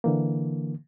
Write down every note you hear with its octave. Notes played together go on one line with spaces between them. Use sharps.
D3 E3 A#3